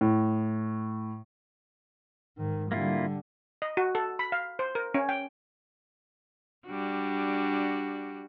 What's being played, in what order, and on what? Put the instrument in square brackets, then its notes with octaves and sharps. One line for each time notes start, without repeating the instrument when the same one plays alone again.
[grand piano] A2
[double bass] G#2 D#3
[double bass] D3 G3 [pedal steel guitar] A#3 E4 F4
[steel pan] D#5
F#4
A4
B5
F5
C5
A#4
C#4
G5
[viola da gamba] G3 D4 F#4